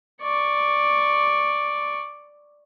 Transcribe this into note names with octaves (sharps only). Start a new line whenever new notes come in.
D5 C#6